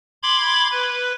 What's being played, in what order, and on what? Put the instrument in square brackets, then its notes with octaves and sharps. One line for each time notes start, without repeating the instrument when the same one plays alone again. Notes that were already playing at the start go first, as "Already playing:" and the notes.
[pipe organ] B5 C6 D6 G#6
B4